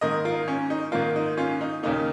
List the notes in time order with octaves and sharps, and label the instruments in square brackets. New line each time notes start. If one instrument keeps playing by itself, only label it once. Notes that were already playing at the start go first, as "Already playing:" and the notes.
[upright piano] G#2 D#3 A#3 A#4 D#5
F4 A#4
C#4
D#4
G#2 D#3 A#3 F4 A#4
D#4
C#4 F4
D#4
D#2 C#3 A#3 D#4